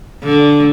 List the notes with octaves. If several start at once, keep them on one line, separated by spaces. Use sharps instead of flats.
D3